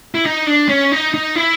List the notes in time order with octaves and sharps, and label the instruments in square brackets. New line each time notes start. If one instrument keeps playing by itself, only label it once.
[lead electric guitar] E4
D#4
D4
C#4
D#4
D#4
E4